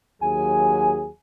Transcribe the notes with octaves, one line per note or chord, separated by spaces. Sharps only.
D#2 F#3 G#4 G#5